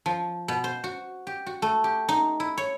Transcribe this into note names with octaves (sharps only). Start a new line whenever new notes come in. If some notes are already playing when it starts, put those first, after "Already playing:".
F3
B2
C5
F#4
G4
F#4
A3
G4
D#4
E4
C#5